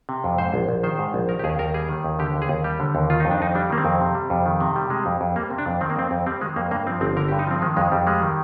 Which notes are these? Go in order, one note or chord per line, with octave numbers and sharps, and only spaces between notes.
C3
F2
G#2 C5
A#1
A#1
D#3 C5
G#2
A#1
D#3 A#4
G4
D#2 G#4
D#2 A#4
G3 G#4
D#3
D#2
D3 G4
D#2
G#4
D#2
G3 G4
D3
D#2
D#3 F4
F2 D#4
D4
F2 D#4
G3 D4
D#3 A#3
C4
F2
C3
G3
F2
D#3
C3
G3
C3 G#3
F2
F2
G3 A#3
C3
D4
F2
D#3 C4
A#3
F2 C4
F2
G3 C4
D#3 G#3
F2 A#3
G2 A#3
F3 C4
G1 C4
D3 A#4
G4
G2
D#4
F3 C4
D#3 G#3
F2 G#3
F2 G3
G3 G#3
D#3